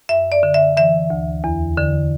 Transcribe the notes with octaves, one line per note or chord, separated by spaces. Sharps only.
F#2 E5
D5
D3
E5
E3 E5
D2
E2
D3